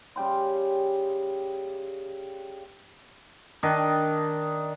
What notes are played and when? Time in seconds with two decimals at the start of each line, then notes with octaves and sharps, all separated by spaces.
0.16 C#3 G3 G5 C6
3.63 D#3 D4 D#5